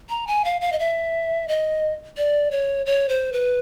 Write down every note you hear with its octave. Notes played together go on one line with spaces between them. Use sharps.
A#5
G#5
F5
F5
D#5
E5
D#5
D5
C#5
C#5
C5
B4